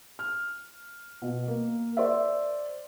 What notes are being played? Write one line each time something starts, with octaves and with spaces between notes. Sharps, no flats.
F6
B2
A#3
C5 D5 E5